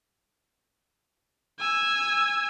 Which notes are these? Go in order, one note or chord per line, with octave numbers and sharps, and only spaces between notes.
G#5 E6